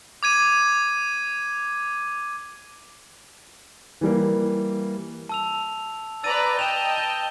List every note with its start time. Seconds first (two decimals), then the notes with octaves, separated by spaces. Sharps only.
0.23 D6 G#6 D#7
4.01 E3 G3 A#3
5.29 A5 E6 F7
6.24 B4 D5 A#5 E6 A6 D#7
6.59 D#5 G5 A5 E7 F7
6.97 G6 G7